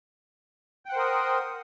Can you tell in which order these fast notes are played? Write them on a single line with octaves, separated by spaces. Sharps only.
G5 F#5 C5 A#4 D#6